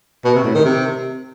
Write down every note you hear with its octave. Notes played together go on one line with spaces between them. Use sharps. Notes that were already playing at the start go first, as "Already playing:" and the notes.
B2
C3
A2
D#3
C3